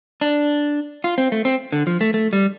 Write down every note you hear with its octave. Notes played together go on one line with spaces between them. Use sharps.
D4
F4
C4
A3
C4
D3
F3
A3
A3
G3